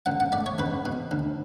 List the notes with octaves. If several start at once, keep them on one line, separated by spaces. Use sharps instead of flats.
C#2 F#5
F#5
A3 D5
C#5
C#2 B4
B2
D2